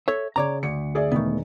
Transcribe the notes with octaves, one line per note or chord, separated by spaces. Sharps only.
A4 C#5 E5
C#3 C#5 D5 A#5
D2 C#7
G#4 D5 E5
E1 D#3 A3 B3